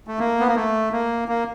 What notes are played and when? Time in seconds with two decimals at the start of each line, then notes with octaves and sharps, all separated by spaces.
0.07 A3
0.19 A#3
0.40 B3
0.48 A#3
0.56 A3
0.92 A#3
1.28 A#3